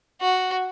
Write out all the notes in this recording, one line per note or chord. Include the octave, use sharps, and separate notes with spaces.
F#4